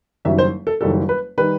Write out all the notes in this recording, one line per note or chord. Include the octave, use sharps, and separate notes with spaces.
F#1 F#2 D#3 G3 E5
C5
A4
F#1 F#2 D#3 G3 A4
B4
D#3 G3 B4